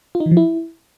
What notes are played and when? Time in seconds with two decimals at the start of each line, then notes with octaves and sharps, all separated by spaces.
0.15 F4
0.20 D#4
0.26 E3
0.31 F3
0.37 E4